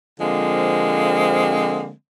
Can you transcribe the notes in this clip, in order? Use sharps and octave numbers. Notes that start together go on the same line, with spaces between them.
D3 F3 G#3 A#3 C4